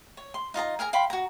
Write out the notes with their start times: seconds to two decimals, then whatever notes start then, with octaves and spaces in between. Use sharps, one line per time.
0.17 C#5
0.34 C6
0.54 D#4 F4 D#5 A#5
0.79 G#4 A#4 G#5 A#5
0.93 F5 G5 B5 C6
1.10 F#4 A#5